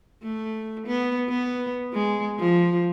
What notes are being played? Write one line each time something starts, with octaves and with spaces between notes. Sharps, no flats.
A3
B3
B3
G#3
F3